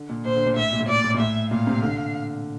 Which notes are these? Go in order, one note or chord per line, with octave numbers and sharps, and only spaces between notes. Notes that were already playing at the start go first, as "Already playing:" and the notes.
Already playing: D3
A#2
A#2 C5
D3
A#2
A2 E5
A#2
A2
A#2 D5
A2
A#2
A2 E5
A#2 F5
C3
D3